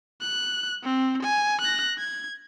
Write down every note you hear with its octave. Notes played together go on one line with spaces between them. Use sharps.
F#6
C4
G#5
F#6 A#6
G#6